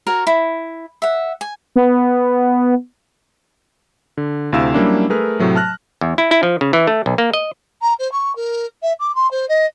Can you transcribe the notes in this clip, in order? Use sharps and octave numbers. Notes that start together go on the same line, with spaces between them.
F#4 A#4 C#5
E4
E5 F#5
G#5
B3
D3
D2 C3 E4 F5 E6 E7
F#3 G3 A#3 C#4 D4 E4
A3 G#4 A#4 B4 F6
A2 C3 F#3 A3
A5 F6 F#6 A#6
E2
E4
E4
F3
C#3
E3
A3
B1
A#3
D#5
A#5
C5
C#6
A#4
E5
D6
C6
C5
D#5